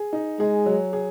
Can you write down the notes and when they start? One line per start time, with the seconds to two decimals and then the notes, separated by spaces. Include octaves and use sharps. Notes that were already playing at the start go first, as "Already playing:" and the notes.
Already playing: G#4
0.13 D#4
0.39 G#3 G#4
0.66 F#3
0.93 G#4